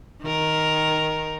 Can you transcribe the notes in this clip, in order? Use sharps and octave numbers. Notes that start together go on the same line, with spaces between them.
D#3 A#4